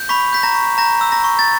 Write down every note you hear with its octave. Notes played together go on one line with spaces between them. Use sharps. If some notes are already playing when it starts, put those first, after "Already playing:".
Already playing: G6
B5 C#6 B6
G6 B6
A#5 A#6
C#6
A#5 G6 A#6
E6
A#5 A#6
C#6
A6